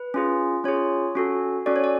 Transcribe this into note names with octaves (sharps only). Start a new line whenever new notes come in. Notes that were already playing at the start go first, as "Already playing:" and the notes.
Already playing: B4
C#4 F4 G#4
C#4 F4 G#4 C#5
C#4 F#4 A4
C#4 F#4 A4 D5
C#5
D5